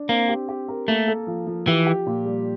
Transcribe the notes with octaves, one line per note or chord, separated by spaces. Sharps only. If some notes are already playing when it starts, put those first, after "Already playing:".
Already playing: D4
A#3 C4
G4
G4
A#4
A3 A#3
A4
F3
F3
E3 G4
G4
A#2
G3